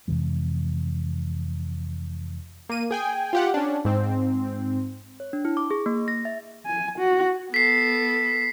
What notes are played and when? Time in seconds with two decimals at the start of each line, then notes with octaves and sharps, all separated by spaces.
0.08 F2 C3 E3 G#3
2.69 A#3 D#7
2.91 G#4 G5 G#5
3.33 F4 G4 F#5
3.54 C#4 D4
3.85 G#2 C4
5.20 C#5
5.33 D4
5.45 E4
5.57 D6
5.71 G#4
5.86 A#3
6.08 A#6
6.25 E5
6.66 G#5
6.99 F#4
7.54 B3 A4 B6 C7